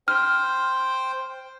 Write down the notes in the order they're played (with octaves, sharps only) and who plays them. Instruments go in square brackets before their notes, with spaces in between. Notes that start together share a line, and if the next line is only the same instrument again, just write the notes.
[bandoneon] C5 G5 [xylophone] F6